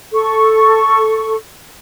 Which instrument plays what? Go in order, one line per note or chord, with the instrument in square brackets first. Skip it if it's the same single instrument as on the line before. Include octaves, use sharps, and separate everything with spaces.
[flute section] A4 C#6